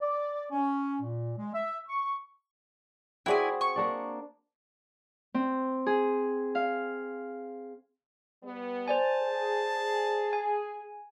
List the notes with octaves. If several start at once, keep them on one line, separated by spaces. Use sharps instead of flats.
D5
C#4
A#2
G#3
E5
C#6
C4 E4 F#4 G#4 D5 G#5
C#6
A#3 D4 D5
C4
G#4
F5
G3 B3
C5 D5 G#5 A5
G#4
G#5